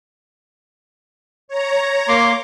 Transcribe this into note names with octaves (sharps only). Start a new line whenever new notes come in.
C#5 A#5
A#3 C6 D6